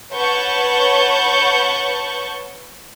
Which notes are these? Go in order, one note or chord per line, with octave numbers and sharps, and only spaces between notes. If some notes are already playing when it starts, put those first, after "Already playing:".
B4 C#5 F#5 A5 C#6 G6